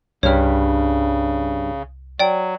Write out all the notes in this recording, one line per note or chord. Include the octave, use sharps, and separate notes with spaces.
C2 G2 C#3 G3 C#5 F6
F#3 D5 G5